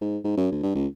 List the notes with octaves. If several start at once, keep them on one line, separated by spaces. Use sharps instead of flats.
G#2
G#2
F#2
D2
G2
C#2